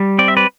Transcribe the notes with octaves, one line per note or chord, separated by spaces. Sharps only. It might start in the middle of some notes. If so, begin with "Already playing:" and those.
Already playing: G3
C4 D5
E5
B4 D5